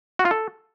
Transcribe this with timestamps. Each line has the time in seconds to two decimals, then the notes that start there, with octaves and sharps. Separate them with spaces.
0.19 F#4
0.25 F4
0.31 A4